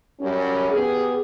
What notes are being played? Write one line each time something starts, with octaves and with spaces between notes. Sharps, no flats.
F#2 G3 C#4
B3 G4 G#4